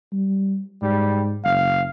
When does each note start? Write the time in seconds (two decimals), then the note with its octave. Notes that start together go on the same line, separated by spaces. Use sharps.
0.12 G3
0.82 G#2 G3
1.44 F#1 F5